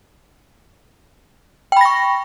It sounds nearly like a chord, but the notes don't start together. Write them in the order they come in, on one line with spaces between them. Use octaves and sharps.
G5 B5 A#6 C#6